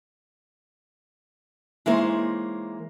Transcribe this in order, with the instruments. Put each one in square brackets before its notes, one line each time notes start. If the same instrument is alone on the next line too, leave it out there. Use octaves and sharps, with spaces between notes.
[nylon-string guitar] E3 G#3 A#3 D#4 C5 C#5